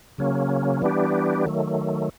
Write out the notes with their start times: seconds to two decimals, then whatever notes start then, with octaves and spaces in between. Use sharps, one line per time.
0.18 C#3 F#3 A#3 C#4
0.82 E3 G3 B3 D4 G4
1.46 D#3 F#3 A3